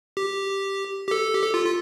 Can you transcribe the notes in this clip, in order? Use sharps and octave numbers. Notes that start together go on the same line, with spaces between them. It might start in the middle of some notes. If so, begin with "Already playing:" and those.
G4
G4
A4
G4
A4
F4
F4